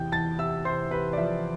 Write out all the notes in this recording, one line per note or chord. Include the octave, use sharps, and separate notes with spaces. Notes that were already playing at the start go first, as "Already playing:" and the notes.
Already playing: E2 C3 G5 G6
E2 A5 A6
C3 E5 E6
C3 C5 C6
C3 B4 B5
D5
F3 E5